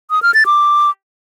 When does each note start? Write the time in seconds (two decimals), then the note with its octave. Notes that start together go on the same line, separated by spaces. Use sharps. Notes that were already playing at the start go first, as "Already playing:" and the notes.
0.11 D#6
0.22 F6
0.34 A6
0.46 D6